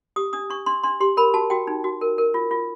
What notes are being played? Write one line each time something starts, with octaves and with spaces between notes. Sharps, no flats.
G4 D#6
D4 D#6
D4 C#6
D4 C6
D4 C6
G4 C6
A#4 B5
F#4 A5
F#4 G5
D#4
F#4
A#4
A#4
F4
F4